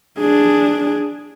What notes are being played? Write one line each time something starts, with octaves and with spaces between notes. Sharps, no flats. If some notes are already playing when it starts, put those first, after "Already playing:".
D4 G#4